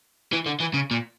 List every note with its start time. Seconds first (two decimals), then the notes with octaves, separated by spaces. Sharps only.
0.33 E3
0.46 D3
0.60 E3
0.74 C#3
0.91 A#2